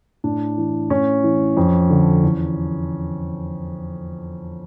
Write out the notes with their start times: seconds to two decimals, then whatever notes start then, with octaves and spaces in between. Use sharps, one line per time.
0.24 A2 D4
0.58 E3
0.90 A2 C#4
1.24 E3
1.57 F2
1.90 D3
2.22 E2